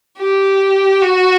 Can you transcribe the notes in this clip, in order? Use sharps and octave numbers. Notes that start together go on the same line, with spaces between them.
G4
F#4